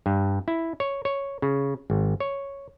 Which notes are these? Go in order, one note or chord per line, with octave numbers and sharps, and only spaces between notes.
G2
E4
C#5
C#5
C#3
G#1
C#5